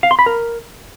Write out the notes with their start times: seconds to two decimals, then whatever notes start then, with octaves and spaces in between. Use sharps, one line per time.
0.03 F5
0.11 C6
0.19 B5
0.26 A#4